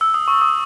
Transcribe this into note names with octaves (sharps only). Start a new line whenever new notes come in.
E6
D#6
C#6
D#6